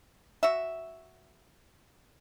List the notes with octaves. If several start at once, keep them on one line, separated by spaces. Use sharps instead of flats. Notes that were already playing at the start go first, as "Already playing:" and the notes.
F#4 E5